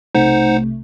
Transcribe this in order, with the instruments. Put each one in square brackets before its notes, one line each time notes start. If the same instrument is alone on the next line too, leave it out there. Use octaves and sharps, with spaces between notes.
[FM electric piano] B1 C3 A3 [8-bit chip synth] D#4 C5 F#5